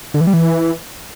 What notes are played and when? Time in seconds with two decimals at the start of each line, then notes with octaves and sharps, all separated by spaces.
0.14 D3
0.21 E3
0.27 G3
0.33 E3